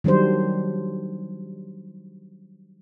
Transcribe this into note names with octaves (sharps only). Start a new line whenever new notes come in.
D#3 F#3 G3 D4 C5